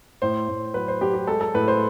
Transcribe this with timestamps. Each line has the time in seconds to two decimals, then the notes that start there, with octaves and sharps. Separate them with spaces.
0.22 A2 C5
0.48 A2
0.74 F#3 B4
0.88 C5
1.01 F#3 G4
1.14 G4
1.27 G#3 A4
1.41 A4
1.54 A2 B4
1.68 C5